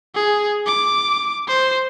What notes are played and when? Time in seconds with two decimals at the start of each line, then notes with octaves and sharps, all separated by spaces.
0.15 G#4
0.66 D6
1.48 C5